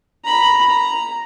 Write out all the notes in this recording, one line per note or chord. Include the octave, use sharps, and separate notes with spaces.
A#5 B5
A#5